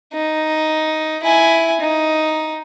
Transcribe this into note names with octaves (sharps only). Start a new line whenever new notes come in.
D#4
E4 G#5
D#4